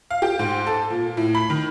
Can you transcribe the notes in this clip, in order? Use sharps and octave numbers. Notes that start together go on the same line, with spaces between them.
F5
G4
G#2
A4
A#2
A2
B5
D#3